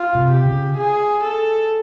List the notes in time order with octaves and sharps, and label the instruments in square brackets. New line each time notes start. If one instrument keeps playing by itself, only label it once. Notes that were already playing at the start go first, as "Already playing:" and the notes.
Already playing: [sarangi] F4
[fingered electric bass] C3
[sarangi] G4
[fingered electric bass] C#3
[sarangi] G#4
A4